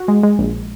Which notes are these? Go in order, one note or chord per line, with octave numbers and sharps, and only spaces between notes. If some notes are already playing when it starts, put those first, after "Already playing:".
Already playing: F#4
G#3
G#3
A#1